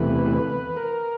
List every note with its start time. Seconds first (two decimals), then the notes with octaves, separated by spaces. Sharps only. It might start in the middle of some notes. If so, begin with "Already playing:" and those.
Already playing: E2 C3 E3 A3 B4
0.77 A#4